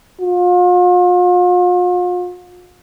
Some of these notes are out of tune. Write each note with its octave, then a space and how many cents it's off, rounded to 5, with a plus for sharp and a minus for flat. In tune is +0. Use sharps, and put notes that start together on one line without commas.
F4 +40